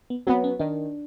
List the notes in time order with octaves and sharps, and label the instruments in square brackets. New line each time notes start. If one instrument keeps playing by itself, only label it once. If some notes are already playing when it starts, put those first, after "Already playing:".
[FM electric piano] B3
[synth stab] F#3 B3 [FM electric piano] C4
[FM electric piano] C#4
[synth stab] D#3 [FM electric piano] D4